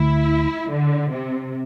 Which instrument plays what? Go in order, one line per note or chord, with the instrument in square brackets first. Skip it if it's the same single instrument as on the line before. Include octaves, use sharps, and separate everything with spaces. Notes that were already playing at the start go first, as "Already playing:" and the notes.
Already playing: [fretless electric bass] D2 D3 A3 [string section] E4
[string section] D3
C3